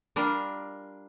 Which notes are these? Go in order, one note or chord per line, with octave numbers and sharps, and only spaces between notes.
G3 D4 F4 A#4